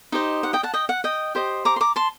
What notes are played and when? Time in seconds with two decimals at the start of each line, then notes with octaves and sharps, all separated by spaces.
0.12 D#4 G4 C5 D#5
0.43 F#5
0.53 D#5 G5
0.63 F#5 A5
0.74 D#5 G5
0.89 F#5
1.04 D#5 G5
1.35 G4 C5 D#5
1.65 A#5 D6
1.76 C6
1.81 A#5 D6
1.96 A5 C6